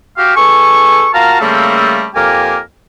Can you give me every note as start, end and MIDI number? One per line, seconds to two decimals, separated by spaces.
0.18 0.35 66
0.18 0.35 67
0.18 0.35 77
0.36 1.08 40
0.36 1.08 69
0.36 1.08 80
0.36 1.08 85
1.14 1.38 65
1.14 1.38 66
1.14 1.38 70
1.14 1.38 77
1.14 1.38 81
1.14 1.38 82
1.41 2.07 49
1.41 2.07 55
1.41 2.07 57
1.41 2.07 58
1.41 2.07 60
1.41 2.07 69
2.15 2.59 41
2.15 2.59 58
2.15 2.59 67
2.15 2.59 70
2.15 2.59 80